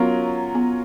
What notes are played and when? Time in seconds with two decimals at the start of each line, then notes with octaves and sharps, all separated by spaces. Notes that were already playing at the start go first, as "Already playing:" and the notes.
Already playing: F#3 B3 C#4 F4 A#4
0.55 B3